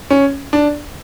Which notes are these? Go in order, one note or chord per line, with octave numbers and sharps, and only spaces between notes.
C#4
D4